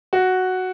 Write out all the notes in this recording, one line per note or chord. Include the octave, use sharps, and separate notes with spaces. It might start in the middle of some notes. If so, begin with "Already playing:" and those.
F#4